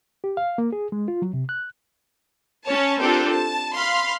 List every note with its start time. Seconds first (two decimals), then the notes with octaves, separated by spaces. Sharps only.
0.24 G4
0.37 F5
0.58 A#3
0.72 G#4
0.92 G#3
1.08 F4
1.22 F#3
1.33 C3
1.49 F#6
2.66 C#4 C#5 A5
2.99 C4 D4 F4 G4 A4 A#4
3.32 A5
3.76 F5 B5 C6 F6